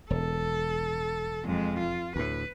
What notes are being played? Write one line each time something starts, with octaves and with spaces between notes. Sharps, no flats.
E1 A4
F2 G#3
F4
D2 A2 B4